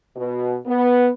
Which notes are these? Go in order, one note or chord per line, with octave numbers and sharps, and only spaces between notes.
B2
B3